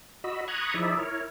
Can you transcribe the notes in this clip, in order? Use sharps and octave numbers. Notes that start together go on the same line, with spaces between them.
F#4 D#5 B5 E6
A#5 B5 C#6 D#6 F#6 G#6
F3 D#4 E4 G#4 D5 E5
E4 A#4 C#5